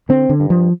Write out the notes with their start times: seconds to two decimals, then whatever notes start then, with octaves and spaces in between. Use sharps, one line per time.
0.09 D3 C4
0.30 D3
0.40 G2
0.50 F3